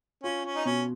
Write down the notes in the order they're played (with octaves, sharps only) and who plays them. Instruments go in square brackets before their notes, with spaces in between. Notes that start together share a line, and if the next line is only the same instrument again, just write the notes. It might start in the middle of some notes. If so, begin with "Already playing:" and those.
[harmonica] C#4 [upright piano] F4
[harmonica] C#4
D#4
[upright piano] B2 [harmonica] C#4